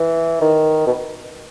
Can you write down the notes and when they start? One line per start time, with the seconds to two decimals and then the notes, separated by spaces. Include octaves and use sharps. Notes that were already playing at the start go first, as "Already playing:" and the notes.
Already playing: E3
0.41 D#3
0.87 B2